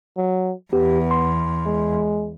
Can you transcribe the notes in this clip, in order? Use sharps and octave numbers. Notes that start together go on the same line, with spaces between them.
F#3
E2 B3 G4
C6
G#3